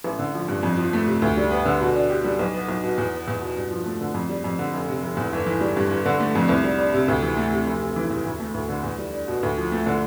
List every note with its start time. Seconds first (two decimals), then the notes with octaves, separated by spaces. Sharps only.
0.04 A1
0.19 D3
0.34 F3
0.48 G2
0.63 F2
0.77 F3
0.93 A3
1.07 C3
1.22 D2
1.37 G3
1.51 B3
1.66 D3
1.81 B2
1.96 D4
2.10 G4
2.24 G3
2.39 B1
2.54 B3
2.68 B1
2.84 B2
2.98 E2
3.13 B3
3.28 E2
3.41 B2
3.56 G2
3.71 F3
3.86 A3
4.01 D3
4.14 F2
4.29 G3
4.44 F2
4.59 D3
4.73 F1
4.88 C3
5.02 F1
5.17 E2
5.33 G1
5.46 E3
5.61 G3
5.77 G2
5.91 G1
6.06 D3
6.20 A3
6.35 F2
6.49 C2
6.64 G3
6.78 D4
6.94 C3
7.08 D2
7.22 E3
7.37 A3
7.52 C3
7.66 F1
7.82 C3
7.96 E3
8.10 E2
8.25 D2
8.40 A3
8.54 D2
8.69 D3
8.83 E2
8.98 G3
9.13 D4
9.28 B2
9.43 D2
9.57 F3
9.72 A3
9.86 D3